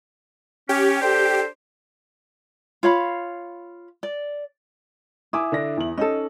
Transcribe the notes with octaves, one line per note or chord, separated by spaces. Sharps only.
C#4 G4
D4 A4 C5
F4 C#5 F5 B5
D5
E4 G#5 D6 D#6
D3 D4 A#6
E2 F#7
C#4 D#4 A4 D#5